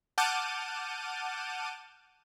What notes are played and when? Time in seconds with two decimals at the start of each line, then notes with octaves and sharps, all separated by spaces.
0.18 F#5 A5 D6 F6 G6 D#7